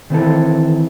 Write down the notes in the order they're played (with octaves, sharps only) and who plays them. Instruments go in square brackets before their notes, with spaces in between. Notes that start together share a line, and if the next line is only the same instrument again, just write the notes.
[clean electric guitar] D#3 E3 C4 C#4 E4 A4